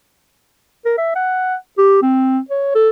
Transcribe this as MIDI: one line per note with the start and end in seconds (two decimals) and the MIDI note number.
0.85 0.93 70
0.98 1.15 76
1.16 1.55 78
1.78 2.01 67
2.02 2.39 60
2.50 2.72 73
2.75 2.90 69